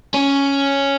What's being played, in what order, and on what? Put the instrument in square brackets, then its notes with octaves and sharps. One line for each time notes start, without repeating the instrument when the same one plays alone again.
[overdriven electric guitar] C#4